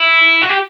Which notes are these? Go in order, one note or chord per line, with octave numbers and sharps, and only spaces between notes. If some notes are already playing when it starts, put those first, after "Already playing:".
Already playing: E4
F#4
G4